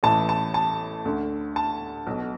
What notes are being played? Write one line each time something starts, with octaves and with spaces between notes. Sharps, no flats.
A1 A2 E3 A5
A5
A5
D2 D3
A5
B1 B2